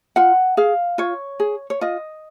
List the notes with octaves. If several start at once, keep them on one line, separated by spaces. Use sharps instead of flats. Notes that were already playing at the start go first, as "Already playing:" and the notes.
F4 F#5
G#4 F5
F4 C#5
G#4
C#5
F4 D#5